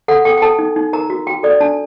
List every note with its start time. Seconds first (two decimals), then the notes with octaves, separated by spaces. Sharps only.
0.08 A4 F#5
0.25 A4 G5
0.37 G5
0.42 A4 A5
0.59 D#4
0.76 D#4
0.93 A#4 A#5
1.10 F#4
1.27 F#4 G5
1.43 A4 D5
1.61 D4 A5